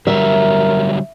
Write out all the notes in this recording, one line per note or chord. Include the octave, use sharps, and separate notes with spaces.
D3 F#3 G3 A#4 E5